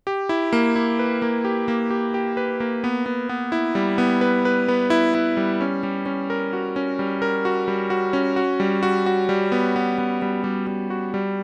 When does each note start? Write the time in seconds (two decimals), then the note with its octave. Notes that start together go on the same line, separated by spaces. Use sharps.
0.07 G4
0.29 E4
0.53 A#3
0.76 E4
0.99 B4
1.22 A#3
1.45 G4
1.68 A#3
1.90 G4
2.14 G4
2.37 B4
2.60 A#3
2.84 B3
3.06 B3
3.29 B3
3.52 E4
3.75 G3
3.98 B3
4.21 B4
4.45 B4
4.68 B3
4.90 E4
5.15 E4
5.37 G3
5.61 C#4
5.83 G3
6.06 C#4
6.30 A#4
6.53 F#4
6.76 C#4
6.99 G3
7.22 A#4
7.45 F#4
7.68 G3
7.90 F#4
8.13 C#4
8.36 F#4
8.60 G3
8.83 F#4
9.06 F#4
9.29 G3
9.52 B3
9.76 B3
9.98 B3
10.22 G3
10.44 G3
10.67 G3
10.90 F#4
11.14 G3